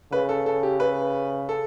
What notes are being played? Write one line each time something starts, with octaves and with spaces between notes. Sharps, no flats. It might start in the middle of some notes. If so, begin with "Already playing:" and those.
C#3 B4
A4
A4
G4
B4
A4